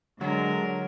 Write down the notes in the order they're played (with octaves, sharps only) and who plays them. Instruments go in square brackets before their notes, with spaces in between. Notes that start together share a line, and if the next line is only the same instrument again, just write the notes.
[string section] D3 [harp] F#3 [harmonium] G#3 [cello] A#4